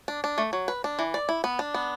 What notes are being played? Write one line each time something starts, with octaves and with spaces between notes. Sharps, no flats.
D4
D4
A3
F#3
B4
D4
E3
D5
E4
B3
D4
B3